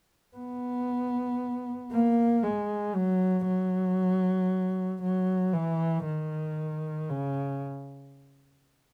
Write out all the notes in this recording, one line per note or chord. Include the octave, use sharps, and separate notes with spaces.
B3
A#3
G#3
F#3
F#3
F#3
E3
D#3
C#3